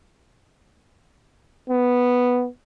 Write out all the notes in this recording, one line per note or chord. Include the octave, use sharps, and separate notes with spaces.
B3